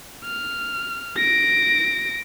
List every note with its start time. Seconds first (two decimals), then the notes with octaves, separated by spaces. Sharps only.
0.25 F6
1.17 A#6 D7